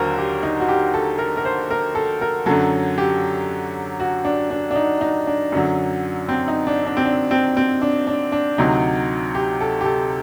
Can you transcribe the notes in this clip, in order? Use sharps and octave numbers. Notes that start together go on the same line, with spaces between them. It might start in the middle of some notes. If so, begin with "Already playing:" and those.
Already playing: D#2 D3 F#3 A#4 C5
G4
D#4
F#4
G4
A4
A#4
A#4
C5
A#4
A4
A#4
F#2 D3 F#3 A4
G4
F#4
D4
D4
D4
D#4
D#4
D4
F#2 D3 F#3
C4
D#4
D4
D4
C4
D4
C4
C4
D4
D4
D4
D2 C3 F#3 D#4
G4
A4
G4
A4